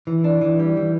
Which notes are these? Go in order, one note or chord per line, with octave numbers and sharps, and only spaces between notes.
E3
D4
E3
G3
E3